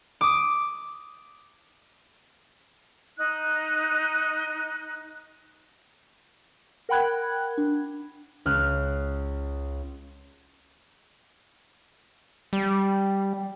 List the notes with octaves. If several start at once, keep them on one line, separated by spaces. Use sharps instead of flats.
D6 D#6
D#4 F#6
A#4 F#5 G5 B5 F#6 G#6
D4
C#2 F6 F#6
G3